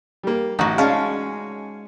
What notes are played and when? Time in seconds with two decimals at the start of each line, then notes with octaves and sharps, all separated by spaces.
0.23 G3 A#3
0.59 A1 D#4 F#4 F#5
0.78 G#3 C#4 F5 A5